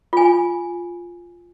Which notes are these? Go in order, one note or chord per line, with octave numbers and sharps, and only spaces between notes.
F4 G#5